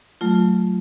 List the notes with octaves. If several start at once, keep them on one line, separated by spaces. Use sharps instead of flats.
F#3 A3 F4